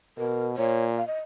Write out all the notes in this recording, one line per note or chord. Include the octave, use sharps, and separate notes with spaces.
B2 A#4
A#2 C#5
F5
D#5